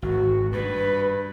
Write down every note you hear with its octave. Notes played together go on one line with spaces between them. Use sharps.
G#1 F#4
G2 B4